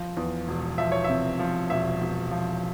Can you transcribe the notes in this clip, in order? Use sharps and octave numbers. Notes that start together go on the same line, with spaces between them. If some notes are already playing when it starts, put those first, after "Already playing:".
Already playing: F3
E2
E1
F3 E5
C#5
C3 E5
F3
E1 E5
E1
F3